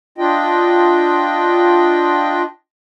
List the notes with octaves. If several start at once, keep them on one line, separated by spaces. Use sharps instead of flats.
D4 F4 D#5 G5